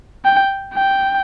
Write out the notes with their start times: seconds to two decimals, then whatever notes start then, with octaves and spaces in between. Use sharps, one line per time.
0.25 G5
0.74 G5